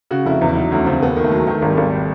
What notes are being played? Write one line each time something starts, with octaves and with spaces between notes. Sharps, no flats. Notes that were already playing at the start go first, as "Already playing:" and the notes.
C#3 F#4
F1 E4
E2
E4
F#3 D#4
D2 C#4
C#3 C4
D#2 B3
D#3
A3
F#3
D#3 A3
G#1
G3
G#1